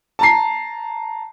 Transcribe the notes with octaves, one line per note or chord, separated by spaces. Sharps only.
A5 A#5 C7